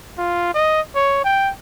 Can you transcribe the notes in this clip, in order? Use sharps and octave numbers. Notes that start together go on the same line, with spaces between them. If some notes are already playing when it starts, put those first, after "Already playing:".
F4
D#5
C#5
G5